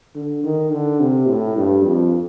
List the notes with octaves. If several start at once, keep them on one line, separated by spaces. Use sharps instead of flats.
D3
D#3
D3
C3
A2
G2
F2